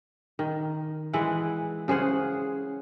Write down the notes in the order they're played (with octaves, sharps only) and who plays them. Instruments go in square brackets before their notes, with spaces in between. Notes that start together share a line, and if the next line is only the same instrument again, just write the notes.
[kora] D#3
E3 G#3 E4 F#5
C#3 G#4 C5 F#5